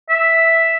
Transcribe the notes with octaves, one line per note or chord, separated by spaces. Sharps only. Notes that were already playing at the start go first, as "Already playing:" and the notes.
E5